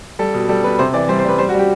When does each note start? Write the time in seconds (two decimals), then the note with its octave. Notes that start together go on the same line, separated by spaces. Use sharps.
0.19 G3 A4
0.34 B2
0.49 G3 A4
0.64 B2 B4
0.79 C3 C5
0.94 E3 D5
1.09 G3 C5
1.19 C5
1.24 G3 B4
1.39 G3 C5
1.49 F#4
1.54 G3 G4